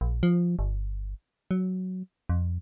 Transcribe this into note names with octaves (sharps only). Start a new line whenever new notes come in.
A#1
F3
G1
F#3
F2